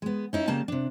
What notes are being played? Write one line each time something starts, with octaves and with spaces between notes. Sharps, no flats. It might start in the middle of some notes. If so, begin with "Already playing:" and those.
G#3 B3
C#4 D#4 E4
C#3 G3 A#3 A5
C3 D4